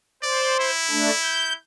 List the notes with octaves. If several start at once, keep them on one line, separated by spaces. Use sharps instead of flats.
C5 D5
E4
A3 D4
G6